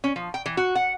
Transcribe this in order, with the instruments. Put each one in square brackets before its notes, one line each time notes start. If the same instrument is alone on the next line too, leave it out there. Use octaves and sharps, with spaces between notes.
[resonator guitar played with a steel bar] C#4
F3
G5
E3
F#4
F#5